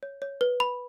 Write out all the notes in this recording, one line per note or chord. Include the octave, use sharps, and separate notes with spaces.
C#5
C#5
B4
B5